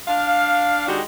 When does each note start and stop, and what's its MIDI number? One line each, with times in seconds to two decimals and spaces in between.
0.08 0.85 62
0.08 0.85 77
0.88 1.01 51
0.88 1.01 56
0.88 1.01 62
0.88 1.01 66
0.88 1.01 67